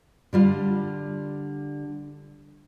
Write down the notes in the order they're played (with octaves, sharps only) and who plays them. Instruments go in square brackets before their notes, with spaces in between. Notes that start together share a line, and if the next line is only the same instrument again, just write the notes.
[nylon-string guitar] D3 G3 F4